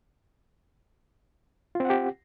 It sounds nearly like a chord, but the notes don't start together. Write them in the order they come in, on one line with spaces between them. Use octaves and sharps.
F4 C4 F#5 G4